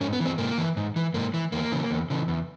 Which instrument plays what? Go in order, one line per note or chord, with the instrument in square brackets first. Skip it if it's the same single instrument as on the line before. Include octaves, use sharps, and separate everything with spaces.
[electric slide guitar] G#2 C#4
B3
E3
C4
G#2 A#3
E3
G#2
E3
G#2 A#3
E3
E2 A#3
C#3 E3
E2
C#3 E3
E2